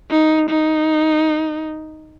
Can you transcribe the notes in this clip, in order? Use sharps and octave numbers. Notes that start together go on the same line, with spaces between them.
D#4
D#4